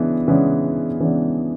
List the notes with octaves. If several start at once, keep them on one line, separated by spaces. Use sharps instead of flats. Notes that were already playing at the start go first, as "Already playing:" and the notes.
Already playing: C#3 E3 G#3 B3 D4
C#3 E3 G#3 B3 D4
C#3 E3 G#3 B3 D4